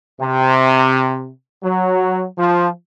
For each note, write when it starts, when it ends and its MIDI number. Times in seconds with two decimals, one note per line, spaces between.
0.20 1.30 48
1.63 2.26 54
2.38 2.68 53